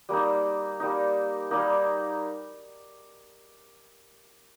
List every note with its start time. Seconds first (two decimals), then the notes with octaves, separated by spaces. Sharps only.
0.09 G3 A#3 D#4
0.80 G3 A#3 D#4
1.51 G3 A#3 D#4